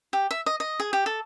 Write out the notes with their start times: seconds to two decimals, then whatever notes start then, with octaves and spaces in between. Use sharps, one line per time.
0.13 G4
0.31 E5
0.46 D#5
0.60 D#5
0.80 G#4
0.93 G4
1.06 A4